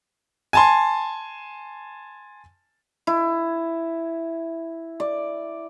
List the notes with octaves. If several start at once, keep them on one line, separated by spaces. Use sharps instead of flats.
G#5 A5 C6
E4
D5